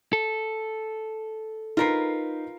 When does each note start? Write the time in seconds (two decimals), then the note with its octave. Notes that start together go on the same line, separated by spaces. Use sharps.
0.13 A4
1.77 D#4 F4 A#4 B4 C7